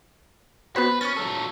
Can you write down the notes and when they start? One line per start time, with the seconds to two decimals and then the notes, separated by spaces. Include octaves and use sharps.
0.76 B3 F#4 B4 C5
1.01 C#4 C#6 F6 A6
1.17 F#3 A4